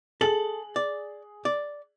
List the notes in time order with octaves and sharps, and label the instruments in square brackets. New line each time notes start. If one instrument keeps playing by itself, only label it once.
[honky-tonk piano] G#4 F#7 [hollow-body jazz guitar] A4
[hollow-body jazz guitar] D5
D5